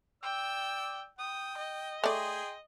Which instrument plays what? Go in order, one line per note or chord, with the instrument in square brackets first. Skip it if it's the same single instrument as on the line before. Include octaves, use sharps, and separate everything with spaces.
[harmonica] D5 E6 [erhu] G5
[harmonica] G5 [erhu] D#6
[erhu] D#5
[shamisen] A3 D5 [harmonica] G#4 G5 C6